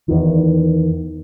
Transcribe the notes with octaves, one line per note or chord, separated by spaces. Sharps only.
E2 D#3